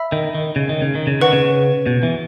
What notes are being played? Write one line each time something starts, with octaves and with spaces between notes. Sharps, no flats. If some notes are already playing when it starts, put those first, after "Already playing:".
Already playing: E5 B5 E6
D#3
D#3
C#3
D#3
C#3
D#3
C#3
D#3 B4 F#5 C#6
C#3
B2
E3